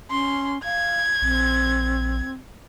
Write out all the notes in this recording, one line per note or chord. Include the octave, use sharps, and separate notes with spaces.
C#4 C6
F5 G#6
A#1 C4